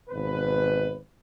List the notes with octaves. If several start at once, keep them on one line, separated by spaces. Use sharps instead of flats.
G#1 B2 B4